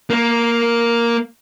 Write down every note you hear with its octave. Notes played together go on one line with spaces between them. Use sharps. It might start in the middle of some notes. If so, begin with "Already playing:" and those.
A#3 A#4